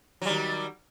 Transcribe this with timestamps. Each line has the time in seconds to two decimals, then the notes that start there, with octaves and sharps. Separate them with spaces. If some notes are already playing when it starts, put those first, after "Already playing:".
0.22 F#3
0.25 G3
0.29 D#3